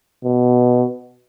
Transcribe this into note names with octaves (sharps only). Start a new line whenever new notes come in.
B2